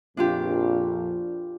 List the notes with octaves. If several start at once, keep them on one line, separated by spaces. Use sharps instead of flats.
A#1 F2 D4 F4 G4